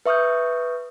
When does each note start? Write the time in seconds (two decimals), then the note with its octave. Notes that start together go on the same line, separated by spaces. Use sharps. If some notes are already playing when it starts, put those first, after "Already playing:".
0.06 B4 E5 C#6 D#6 F6 G6